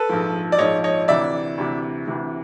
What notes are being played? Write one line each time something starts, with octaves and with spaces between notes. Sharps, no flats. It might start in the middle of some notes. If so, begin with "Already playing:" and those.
Already playing: A4 B4
A#1 G#2 F3
D5
A#1 G#2 F3 C#5 D#5
C#5 D#5
D2 C3 E3 D5 E5
D2 C3 E3
D2 C3 E3